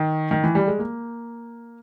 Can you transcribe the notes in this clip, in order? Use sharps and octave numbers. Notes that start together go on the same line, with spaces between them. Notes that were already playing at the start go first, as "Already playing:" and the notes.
Already playing: D#3
D#3
E3
G3
G#3
A#3